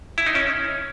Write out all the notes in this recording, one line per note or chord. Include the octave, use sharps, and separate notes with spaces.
E4
D#4
C#4